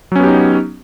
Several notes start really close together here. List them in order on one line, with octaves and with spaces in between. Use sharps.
F#3 C#4 B3 G4 D#4